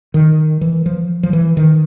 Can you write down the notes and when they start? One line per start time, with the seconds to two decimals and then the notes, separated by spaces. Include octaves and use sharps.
0.14 D#3
0.61 E3
0.86 F3
1.23 F3
1.33 E3
1.57 D#3